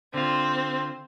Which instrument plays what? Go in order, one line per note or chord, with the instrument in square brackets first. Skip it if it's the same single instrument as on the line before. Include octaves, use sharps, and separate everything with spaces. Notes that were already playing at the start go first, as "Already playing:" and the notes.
[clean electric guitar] D3 F4 [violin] C4